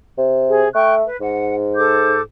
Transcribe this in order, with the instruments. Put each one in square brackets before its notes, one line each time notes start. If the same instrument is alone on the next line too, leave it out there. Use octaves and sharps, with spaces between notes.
[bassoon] C3
[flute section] G#4
[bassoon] A3 [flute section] G5 C#6 F#6
[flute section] B4
[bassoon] G#2 [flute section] F#5
[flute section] A4 D6 G6